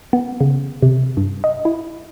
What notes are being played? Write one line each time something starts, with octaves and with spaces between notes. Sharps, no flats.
B3
C#3
C3
G2
D#5
E4